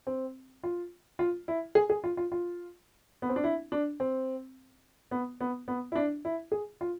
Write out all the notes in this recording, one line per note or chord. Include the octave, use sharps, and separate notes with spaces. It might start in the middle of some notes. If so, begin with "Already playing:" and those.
C4
F4
F4
E4
G#4
G#4
F4
F4
F4
B3
C4
D4
E4
D4
C4
B3
B3
B3
E4
D4
E4
G#4
F4